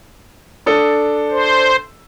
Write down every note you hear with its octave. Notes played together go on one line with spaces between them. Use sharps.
D4 A4 D#6
C5